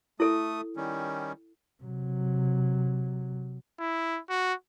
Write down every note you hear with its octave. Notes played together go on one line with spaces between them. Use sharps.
A3 E4 A4 D#6
D#3 G3 C#4
C3 F#3
E4
F#4